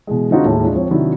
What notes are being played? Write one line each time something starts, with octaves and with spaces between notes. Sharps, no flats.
B2 E3 G#3
D3 G#3 C4 D#4 F4 F#4
D#2 A2 G#3
G#3 D4 F4 G#4
F3 C4 C#5
C3 D#3 F#3 D4 E4